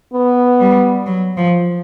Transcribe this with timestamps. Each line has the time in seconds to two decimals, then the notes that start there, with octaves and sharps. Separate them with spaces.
0.13 B3
0.60 G3
1.06 F#3
1.37 F3